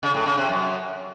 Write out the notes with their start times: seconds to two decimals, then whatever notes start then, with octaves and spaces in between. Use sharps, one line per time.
0.03 C#3
0.14 A2
0.26 C#3
0.37 C3
0.49 F#2